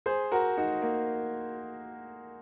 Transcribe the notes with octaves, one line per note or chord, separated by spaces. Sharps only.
G#4 C5
F#4 A#4
D#4 F#4
A#3